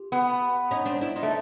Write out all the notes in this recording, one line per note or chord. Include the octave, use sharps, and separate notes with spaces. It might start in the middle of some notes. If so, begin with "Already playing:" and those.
Already playing: F4 G4
B3
C#4 D#4
C4 D4
D4 E4
D#4 F4
A3